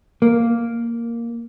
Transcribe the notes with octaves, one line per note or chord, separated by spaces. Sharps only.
A#3